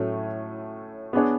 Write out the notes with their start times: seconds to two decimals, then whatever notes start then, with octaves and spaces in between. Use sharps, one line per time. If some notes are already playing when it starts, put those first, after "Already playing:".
Already playing: A2 F#3 A3 C#4
1.13 B3 D4 G#4 C#5